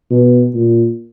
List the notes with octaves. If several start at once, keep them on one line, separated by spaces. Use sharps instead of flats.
B2
A#2